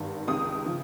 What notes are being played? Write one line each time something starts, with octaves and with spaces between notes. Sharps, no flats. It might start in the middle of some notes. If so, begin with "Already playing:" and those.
Already playing: G#1 G2 D#3
C#2 C3 D#3 D#6
C#3 F3